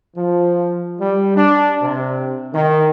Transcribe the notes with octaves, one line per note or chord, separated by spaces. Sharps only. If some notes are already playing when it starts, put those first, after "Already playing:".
F3
G3
D4
C3
D#3